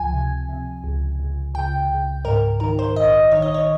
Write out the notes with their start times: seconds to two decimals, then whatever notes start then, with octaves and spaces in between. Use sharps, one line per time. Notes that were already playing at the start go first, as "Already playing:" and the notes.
Already playing: C#2 F3 G#5
0.13 C3
0.49 C3
0.84 C#2
1.20 C#2
1.54 C#2 G5
1.90 C#2
2.25 G#2 A#4
2.60 D#3 A#4
2.79 C5
2.96 A#1 D#5
3.31 D#3 C#5
3.42 D#5
3.54 C#5